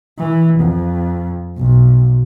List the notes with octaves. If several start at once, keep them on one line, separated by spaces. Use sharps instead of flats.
E3
F2
B1